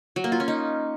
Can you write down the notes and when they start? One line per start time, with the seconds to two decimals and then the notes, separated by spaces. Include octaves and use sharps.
0.16 F#3
0.24 A#3
0.32 F4
0.40 C#4
0.48 D#4